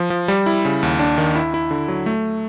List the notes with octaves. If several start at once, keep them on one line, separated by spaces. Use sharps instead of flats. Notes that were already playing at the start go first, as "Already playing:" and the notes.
Already playing: F3
F3
G3
E4
C#3
D#2
D4
D#3
E4
E4
D3
F#3
A3